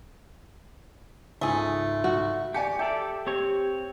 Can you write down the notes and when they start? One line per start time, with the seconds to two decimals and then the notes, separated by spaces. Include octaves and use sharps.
1.41 C#2 G#2 A3 G#4
2.04 F#4
2.54 G4 D5 G#5 C#7
2.79 G4 A4 D5 E5
3.27 C4 G4 C#5